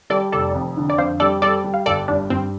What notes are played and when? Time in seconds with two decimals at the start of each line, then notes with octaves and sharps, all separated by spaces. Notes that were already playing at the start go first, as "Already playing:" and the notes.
0.10 G3 A4 D5
0.32 F1 A4 D5
0.55 F2
0.77 D3
0.90 D5
0.98 F2 C5 F5
1.20 G3 A4 D5
1.42 G3 A4 D5
1.64 G3
1.74 F5
1.86 G1 A4 D5
2.08 G2 D4
2.30 G2 C4